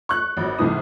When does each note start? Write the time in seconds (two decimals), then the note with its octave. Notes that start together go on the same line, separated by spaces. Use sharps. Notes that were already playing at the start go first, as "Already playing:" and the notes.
0.09 C#6 F#6
0.37 G#1 F#3
0.58 B1 G#2 C3 E3 D#6